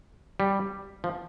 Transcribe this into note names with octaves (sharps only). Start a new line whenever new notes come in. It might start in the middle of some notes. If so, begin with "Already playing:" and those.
G3
F3